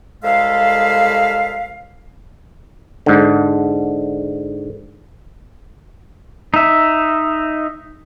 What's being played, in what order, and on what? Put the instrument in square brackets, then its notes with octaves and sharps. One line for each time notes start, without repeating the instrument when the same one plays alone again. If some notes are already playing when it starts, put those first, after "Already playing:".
[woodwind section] C2 G#3 A4 E5 F5
[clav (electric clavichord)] G#2 D3
[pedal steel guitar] D#4 E5